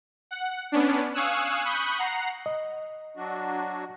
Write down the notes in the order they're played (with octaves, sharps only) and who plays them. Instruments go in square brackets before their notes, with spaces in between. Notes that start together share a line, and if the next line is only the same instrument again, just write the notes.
[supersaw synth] F#5
B3 C#4 D4
F5 G#5 C#6 D#6 E6 F#6
B5 C#6 D#6 F#6 G6
F#5 A#5 C7
[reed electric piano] D#5
[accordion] F#3 D4 F#4